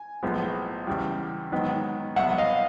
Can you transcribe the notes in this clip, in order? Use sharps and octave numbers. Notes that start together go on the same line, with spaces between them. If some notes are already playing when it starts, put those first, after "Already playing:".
Already playing: G#5
B1 A2 F3 G#3 B3
E2 C#3 E3 G3
G#2 D#3 F#3 B3
C2 B2 F#3 B3 E5 F#5
D#5 F5